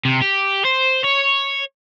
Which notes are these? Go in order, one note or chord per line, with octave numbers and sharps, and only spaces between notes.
C3
G4
C5
C#5